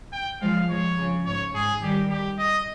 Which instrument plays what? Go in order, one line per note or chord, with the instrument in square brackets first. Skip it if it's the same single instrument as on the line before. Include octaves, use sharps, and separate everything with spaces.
[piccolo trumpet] G5
[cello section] F3 G#3 [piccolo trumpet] F5
[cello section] F3 G#3 [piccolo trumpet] C#5
[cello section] C#3 F3
[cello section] G#2 [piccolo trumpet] C#5
[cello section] G#2 [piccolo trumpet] G#4
[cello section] D#3 G3 [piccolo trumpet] G4
[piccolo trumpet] G4
D#5